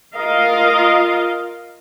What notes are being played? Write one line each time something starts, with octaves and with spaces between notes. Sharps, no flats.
F4 A#4 D#5 F5